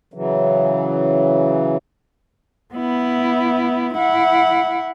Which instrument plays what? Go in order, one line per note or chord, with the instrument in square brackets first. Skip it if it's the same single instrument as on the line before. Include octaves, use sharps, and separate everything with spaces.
[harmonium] C#3 E3 F#3
[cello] B3 E4
E4 F#5